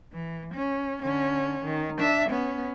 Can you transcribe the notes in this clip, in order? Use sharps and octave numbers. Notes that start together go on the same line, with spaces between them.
E3
C#4
D3 C#4
D#3
D4 E5
B3 C#4